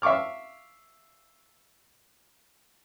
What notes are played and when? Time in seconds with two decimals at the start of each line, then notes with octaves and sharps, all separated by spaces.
0.02 E5 F5 C#6 D6 F6